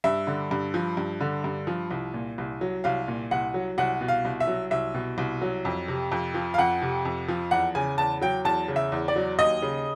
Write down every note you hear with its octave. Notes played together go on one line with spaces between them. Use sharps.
G2 E5
D3
G2
F3
G2
D3
G2
F3
C2
A#2
C2
F#3
C2 F5
A#2
C2 F#5
F#3
C2 F#5
B2
F5
C2
E5
F#3
C2 E5
B2
C2
F#3
F2
C3
F2
F3
F5
F2 F#5
C3
F2
F3
E2 F#5
C#3 G#5
E2 A5
F#3 G5
E2 A5
C#3
E5
E2
D5
F#3
D#2 D#5
C#3